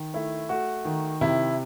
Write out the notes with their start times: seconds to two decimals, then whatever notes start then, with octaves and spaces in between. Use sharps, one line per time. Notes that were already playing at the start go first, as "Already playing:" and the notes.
Already playing: D#3
0.14 A3 E4
0.49 A3 F#4
0.85 D#3
1.21 C3 E4